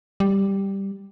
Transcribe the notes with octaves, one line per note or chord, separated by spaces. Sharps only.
G3